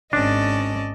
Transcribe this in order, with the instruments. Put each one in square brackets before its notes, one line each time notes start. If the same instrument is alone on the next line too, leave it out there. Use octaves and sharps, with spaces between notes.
[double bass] G#1 [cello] C#4 [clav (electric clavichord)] D4 [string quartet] D5 D#5 A5